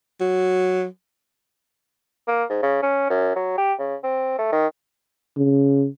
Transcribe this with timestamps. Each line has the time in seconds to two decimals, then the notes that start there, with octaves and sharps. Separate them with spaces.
0.20 F#3
2.28 A#3
2.50 G#2
2.63 C#3
2.82 C#4
3.10 F#2
3.36 F#3
3.58 G4
3.79 C#3
4.04 C4
4.39 A3
4.52 D#3
5.37 C#3